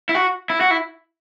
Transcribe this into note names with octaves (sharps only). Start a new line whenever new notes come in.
E4
F#4
E4
F#4
E4